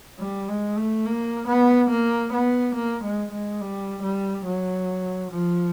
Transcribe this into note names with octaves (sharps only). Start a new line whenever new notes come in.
G3
G#3
A3
A#3
B3
A#3
B3
A#3
G#3
G#3
G3
G3
F#3
F3